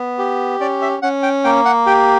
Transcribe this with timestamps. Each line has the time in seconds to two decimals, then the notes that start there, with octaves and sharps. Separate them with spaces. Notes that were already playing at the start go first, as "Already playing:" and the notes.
Already playing: B3
0.18 G4
0.60 C#4 D5
0.82 E5
1.02 C#4 F#5
1.23 G5
1.44 A#3 G5
1.65 F#5
1.86 G4 G5